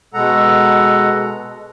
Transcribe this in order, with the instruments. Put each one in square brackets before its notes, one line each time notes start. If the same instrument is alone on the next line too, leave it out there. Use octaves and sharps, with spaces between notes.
[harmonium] B2 G#3 A4 F#5 A#5